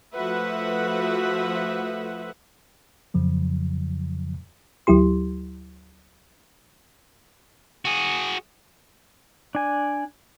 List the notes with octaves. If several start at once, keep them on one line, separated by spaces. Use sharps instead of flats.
F3 A3 F#4 B4 E5 F#5
F2 C#3 F3 F#3
D2 F#3 E4 G4 C6
F#4 G#4
D4 G#5